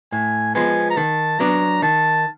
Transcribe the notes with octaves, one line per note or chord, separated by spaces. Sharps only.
A2 G#5
F3 G#3 B3 G#5
A#5
D#3 A5
F#3 B3 D4 A#5
D#3 A5